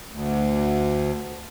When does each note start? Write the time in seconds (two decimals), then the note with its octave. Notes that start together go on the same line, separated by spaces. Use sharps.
0.12 D2